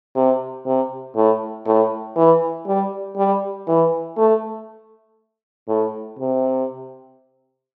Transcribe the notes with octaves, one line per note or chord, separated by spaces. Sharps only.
C3
C3
A2
A2
E3
G3
G3
E3
A3
A2
C3